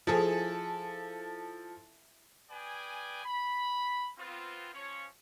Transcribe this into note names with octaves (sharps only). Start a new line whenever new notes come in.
F3 E4 G#4 A4 C#5
G#4 B4 D5 G5 G#5
B5
B3 C4 F4
F3 C#4 C#5